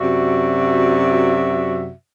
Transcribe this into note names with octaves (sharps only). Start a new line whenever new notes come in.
F#2 C3 F#4 D5 E5